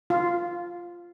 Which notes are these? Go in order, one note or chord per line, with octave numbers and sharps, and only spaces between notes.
F4